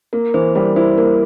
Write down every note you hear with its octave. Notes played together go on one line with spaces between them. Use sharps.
A#3 A#4
E3 C5
G3 A#4
E4 C5
A#3 A#4